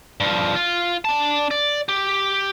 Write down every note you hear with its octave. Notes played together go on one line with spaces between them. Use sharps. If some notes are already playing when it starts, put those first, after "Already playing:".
G2 F3
F4
D4 A5
D5
G4